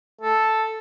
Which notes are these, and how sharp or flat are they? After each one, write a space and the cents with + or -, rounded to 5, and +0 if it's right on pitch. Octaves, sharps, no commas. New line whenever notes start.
A4 +0